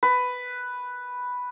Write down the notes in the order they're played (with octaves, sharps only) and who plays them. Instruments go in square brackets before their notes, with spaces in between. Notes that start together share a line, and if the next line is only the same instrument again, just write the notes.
[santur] B4